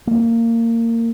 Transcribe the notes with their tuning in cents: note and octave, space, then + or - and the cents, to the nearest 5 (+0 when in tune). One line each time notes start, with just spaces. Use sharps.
A#3 -20